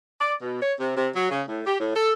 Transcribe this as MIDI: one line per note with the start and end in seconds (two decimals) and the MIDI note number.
0.20 0.33 74
0.40 0.61 47
0.61 0.72 73
0.79 0.93 48
0.96 1.09 48
1.14 1.27 54
1.31 1.42 49
1.48 1.60 45
1.66 1.75 67
1.79 1.94 45
1.95 2.12 69